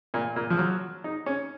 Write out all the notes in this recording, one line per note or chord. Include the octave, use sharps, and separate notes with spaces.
A#2
A#2
F3
F#3
D#4
C#4